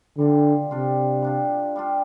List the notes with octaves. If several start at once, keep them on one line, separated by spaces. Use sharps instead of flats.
D3 G3 D4 F4
C3 G3 D4 F4
G3 D4 F4
G3 D4 F4